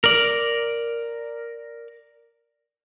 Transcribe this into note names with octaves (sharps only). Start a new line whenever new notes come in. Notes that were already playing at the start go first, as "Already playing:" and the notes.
A#4 D5